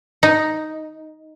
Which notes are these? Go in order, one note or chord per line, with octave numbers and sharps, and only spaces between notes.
D#4